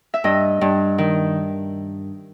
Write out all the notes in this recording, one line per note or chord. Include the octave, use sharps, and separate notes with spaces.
E5
G2 D#5
G2
D#3